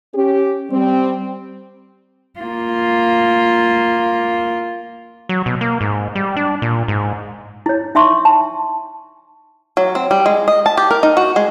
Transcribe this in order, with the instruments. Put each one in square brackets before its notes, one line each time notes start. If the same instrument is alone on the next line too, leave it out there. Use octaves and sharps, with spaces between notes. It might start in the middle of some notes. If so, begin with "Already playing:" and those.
[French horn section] C#4 G4
G3 C4
[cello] A#3 F4
[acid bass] F#3
B2
A#3
G#2
G3
D4
A#2
G#2
[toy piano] E4 C#5
D#4 E5 C6 C#6
A5
[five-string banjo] F#3
C4
G3
G#3
D#5
A5
G4
A#4
D#4
F#4
G#3